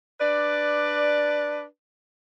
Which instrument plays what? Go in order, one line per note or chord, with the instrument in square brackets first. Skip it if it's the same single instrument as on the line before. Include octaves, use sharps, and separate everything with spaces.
[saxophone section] D4 B4 D5